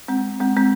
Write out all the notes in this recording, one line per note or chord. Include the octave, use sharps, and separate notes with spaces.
G#3 C4
G#3 C4
G#3 C4